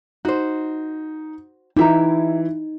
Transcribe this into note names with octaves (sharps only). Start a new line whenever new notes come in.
D#4 F#4 C5
E3 D#4 E4 G4 E5 A#5